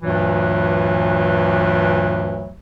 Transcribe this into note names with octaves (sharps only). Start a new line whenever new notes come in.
D2 G2 A#2 E3 F#3